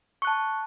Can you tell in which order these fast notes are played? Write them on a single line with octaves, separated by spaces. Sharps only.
C#6 F#6 A5